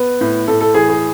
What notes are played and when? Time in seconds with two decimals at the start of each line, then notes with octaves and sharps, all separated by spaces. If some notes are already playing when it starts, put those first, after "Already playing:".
Already playing: B3 B4
0.21 A2
0.47 A2 A4
0.61 A4
0.74 E3 G#4
0.89 G#4